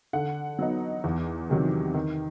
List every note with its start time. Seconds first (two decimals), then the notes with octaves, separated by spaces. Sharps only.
0.13 D3 F#5
0.59 F#3 B3 D#4
1.04 E2
1.50 C3 D#3 F#3
1.94 D#3